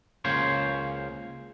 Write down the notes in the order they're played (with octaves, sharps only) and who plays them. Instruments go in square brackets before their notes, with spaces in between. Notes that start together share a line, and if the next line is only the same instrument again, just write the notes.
[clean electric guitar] C#2 C#3 A#3 C5 C#5